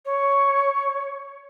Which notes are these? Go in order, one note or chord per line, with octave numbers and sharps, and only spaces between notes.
C#5